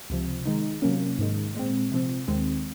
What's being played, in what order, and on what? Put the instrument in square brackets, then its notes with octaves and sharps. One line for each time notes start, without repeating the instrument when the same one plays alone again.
[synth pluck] C#2 C3 F3
D#3 G#3 D#4
C3 F#3 A#3 C#4
G#2 D#3 G#3
A#2 G#3 C4
C3 F3 C4
D#2 D#3 G#3 C4